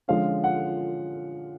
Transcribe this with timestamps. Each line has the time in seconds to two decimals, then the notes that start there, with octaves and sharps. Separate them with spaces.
0.08 D3 F3 G#3 C#4 F4 F5
0.44 F#5